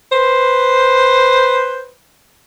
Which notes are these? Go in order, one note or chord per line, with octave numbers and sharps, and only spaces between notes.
B4 C5